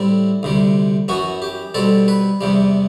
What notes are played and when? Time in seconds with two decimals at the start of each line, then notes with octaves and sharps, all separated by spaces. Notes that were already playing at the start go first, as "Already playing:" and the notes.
Already playing: A2 G3 C4 E4
0.43 D2 C3 G3
1.08 F#2 E3 B3 F#4
1.42 G4
1.75 B2 G3 C4 A4
2.08 B4
2.41 E2 C3 G3